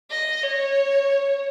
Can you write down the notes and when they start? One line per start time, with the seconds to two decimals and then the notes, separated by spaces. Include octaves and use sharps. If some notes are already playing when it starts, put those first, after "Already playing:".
0.11 D#5
0.43 C#5